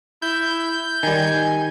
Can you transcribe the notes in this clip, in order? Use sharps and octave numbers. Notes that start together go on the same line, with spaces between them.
E4 G6
D#3 G3 G#5